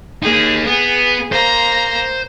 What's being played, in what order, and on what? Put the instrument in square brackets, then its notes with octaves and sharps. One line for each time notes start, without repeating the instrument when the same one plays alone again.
[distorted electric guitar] A#3 D#4 [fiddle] G#4
[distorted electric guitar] B3 [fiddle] G#4
[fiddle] A#3 A#5 [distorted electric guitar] C5